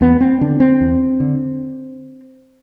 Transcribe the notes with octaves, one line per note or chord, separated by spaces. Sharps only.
E2 B3
C4
D3 D4
C4
E2
D3